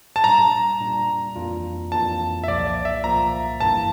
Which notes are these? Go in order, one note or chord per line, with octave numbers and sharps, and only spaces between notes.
A5
A#2 G3 D4 A#5
A#2 G3 D4
F2 E3 A#3 D4 F4
F2 E3 A#3 D4 F4 A5
E5
C2 A#2 F3 A#3 D5
D5
E5
C2 A#2 F3 A#3 A#5
G1 G2 E3 A#3 E4 A5